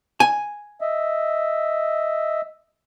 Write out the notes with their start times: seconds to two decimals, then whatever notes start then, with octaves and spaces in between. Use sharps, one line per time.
0.20 G#5
0.81 D#5 E5